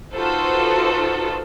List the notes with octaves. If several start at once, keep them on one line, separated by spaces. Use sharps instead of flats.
D#4 F4 F#4 A4 B4 C5